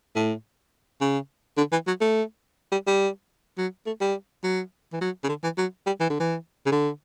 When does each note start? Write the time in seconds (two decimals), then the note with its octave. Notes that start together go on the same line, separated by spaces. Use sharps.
0.16 A2
1.01 C#3
1.58 D3
1.72 E3
1.87 F#3
2.01 A3
2.72 G3
2.87 G3
3.58 F#3
3.87 A3
4.01 G3
4.44 F#3
4.93 E3
5.01 F#3
5.24 C#3
5.29 D3
5.44 E3
5.58 F#3
5.87 G3
6.00 E3
6.10 D3
6.20 E3
6.66 C#3
6.72 D3